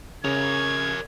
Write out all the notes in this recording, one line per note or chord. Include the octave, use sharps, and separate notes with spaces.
C#3 A#4 C#5 G#6